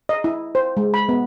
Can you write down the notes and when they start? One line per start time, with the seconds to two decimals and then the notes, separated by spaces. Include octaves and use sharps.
0.09 D#5
0.24 E4
0.55 C5
0.77 G#3
0.94 B5
1.09 B3